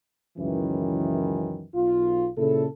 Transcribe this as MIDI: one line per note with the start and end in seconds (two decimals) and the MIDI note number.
0.37 1.66 37
0.37 1.66 42
0.37 1.66 51
0.37 1.66 52
1.74 2.29 35
1.74 2.29 65
2.37 2.66 46
2.37 2.66 49
2.37 2.66 64
2.37 2.66 69